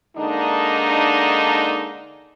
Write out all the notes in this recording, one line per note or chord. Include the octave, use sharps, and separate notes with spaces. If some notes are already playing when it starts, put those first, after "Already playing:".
D3 G#3 A#3 D4 D#4